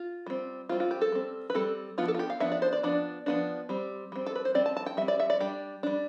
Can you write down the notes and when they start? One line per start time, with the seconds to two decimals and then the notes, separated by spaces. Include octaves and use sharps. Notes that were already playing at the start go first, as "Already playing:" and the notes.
Already playing: F4
0.26 G3 C4
0.69 G3 C4 F4
0.80 F4
0.91 G4
1.01 A4
1.12 G3 C4
1.50 B4
1.55 G3 C4 A4
1.98 F3 B3 D4 F4
2.08 A4
2.14 F4
2.19 G4
2.30 F5
2.40 F3 B3 D4 E5
2.52 D5
2.62 C5
2.73 D5
2.83 F3 B3 D4 D5
3.26 F3 B3 D4
3.69 G3 C4
4.12 G3 C4
4.26 A4
4.36 B4
4.45 C5
4.54 G3 C4 D5
4.66 A5
4.77 A5
4.86 G5
4.97 G3 C4 E5
5.08 D5
5.20 E5
5.30 D5
5.40 G3 D4 G4
5.83 G3 D4